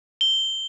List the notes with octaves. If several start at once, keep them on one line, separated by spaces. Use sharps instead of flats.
G7